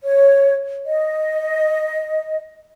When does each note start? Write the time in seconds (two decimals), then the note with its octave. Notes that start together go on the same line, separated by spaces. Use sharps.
0.03 C#5
0.86 D#5